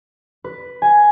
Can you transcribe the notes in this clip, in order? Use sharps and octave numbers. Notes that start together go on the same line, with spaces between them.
B4
G#5